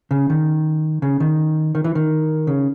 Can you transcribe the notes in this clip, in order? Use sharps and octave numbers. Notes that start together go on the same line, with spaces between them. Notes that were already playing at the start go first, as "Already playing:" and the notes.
C#3
D#3
C#3
D#3
D#3
E3
D#3
C#3